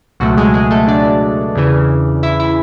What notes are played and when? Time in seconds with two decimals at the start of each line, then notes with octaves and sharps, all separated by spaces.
0.20 C#2 B2 F#3 A3 F#4
0.38 G#3 G#4
0.54 G#3 G#4
0.71 A3 A4
0.88 D4 D5
1.55 E2 C#3 E3
2.23 E4 E5
2.40 E4 E5